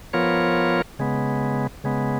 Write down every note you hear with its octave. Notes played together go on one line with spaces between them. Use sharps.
F3 B3 F4 A#4 C#5
C#3 G#3 B3
C#3 G#3 B3